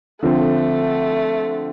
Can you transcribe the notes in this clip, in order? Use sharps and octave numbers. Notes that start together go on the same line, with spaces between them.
D3 F3 A3 C4